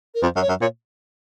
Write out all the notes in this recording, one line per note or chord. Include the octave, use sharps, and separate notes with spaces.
A#4
F2 C5
F#2
C#5
F#2
A#2 C#5